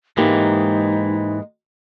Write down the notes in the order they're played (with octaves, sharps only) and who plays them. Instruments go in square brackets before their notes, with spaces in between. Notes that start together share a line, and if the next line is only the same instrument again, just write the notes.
[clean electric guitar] G#2 E3 [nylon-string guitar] G#3 A#3 G4 [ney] D#4